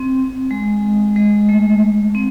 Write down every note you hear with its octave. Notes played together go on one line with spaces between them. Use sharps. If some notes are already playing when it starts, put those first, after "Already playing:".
Already playing: C4
G#3
G#3
A3
C4